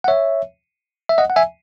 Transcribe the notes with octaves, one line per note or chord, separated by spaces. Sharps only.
F#5
C#5 E5
E5
D#5 F#5
F#5
E5 G#5